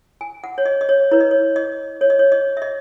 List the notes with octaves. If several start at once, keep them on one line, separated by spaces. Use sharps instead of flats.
G#5
F#5
C#5
D#5
D#5
C#5
E4 B4 C#5
D#5
C#5
D#5
C#5
D#5
C#5
D#5
E5
D#5